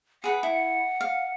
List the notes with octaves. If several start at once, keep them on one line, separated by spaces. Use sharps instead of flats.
G#4 B4 F#5
E4
F5